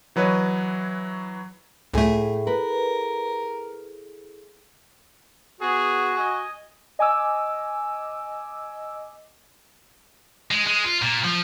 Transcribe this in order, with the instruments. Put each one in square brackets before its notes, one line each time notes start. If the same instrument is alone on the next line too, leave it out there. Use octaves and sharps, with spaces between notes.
[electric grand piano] E3 F#3 B4 C#5 D#5
[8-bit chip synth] C#2 A3 [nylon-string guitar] A2 G#5 [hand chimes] E4 G#4 A4
[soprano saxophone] A#4 [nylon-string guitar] B4
[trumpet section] B3 G#4 [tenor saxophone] F#4
[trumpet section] D#5 G#5
[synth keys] D#5 G#5 D6 E6
[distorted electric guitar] G#3
G#3
F4
A#2
F3